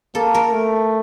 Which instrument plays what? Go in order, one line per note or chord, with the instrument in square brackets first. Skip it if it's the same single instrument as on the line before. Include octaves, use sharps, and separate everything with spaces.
[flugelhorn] A#3 [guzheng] A4
[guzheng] A#4
[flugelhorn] A3